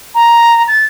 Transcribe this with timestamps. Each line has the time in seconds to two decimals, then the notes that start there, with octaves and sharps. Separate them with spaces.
0.15 A#5
0.68 A6